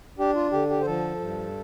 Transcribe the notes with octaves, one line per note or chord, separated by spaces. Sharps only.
D4 G4
F4
D3 G4
G4
C5
F3 A4
G2